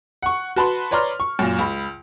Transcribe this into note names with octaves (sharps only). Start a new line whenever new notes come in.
F#5 C#6
F#4 B4 A5 B5 C6
B4 C#5 D5 A#5 C6 F6
C#6
F#2 A#2
C#2 B5